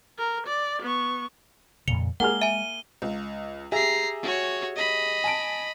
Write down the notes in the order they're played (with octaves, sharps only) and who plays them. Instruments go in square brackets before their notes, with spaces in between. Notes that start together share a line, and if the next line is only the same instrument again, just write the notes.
[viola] A#4
D5
B3 C#6
[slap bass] F2 A#2 C#3 [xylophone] C#7 F7 G7
[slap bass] G#3 [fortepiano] A#3 G#4 F6 [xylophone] F#5 [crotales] G7
[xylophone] E5 G#5 [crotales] D#7
[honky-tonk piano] C#2
[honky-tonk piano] G4 G#4 E5 [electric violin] A#5 C7
[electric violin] F#4 C#5
D#5 B5
[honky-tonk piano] G#5 A5 D7